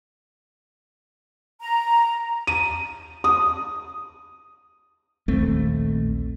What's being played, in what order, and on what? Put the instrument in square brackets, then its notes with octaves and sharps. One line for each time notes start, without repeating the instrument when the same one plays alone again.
[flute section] A#5
[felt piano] D#7
D#6
[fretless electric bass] A#1 D#2 A3 C4